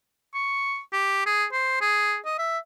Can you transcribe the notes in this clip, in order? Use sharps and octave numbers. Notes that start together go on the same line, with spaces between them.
C#6
G4
G#4
C5
G#4
D#5
E5